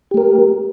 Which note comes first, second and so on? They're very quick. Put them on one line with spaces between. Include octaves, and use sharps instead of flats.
G4 A3 A#4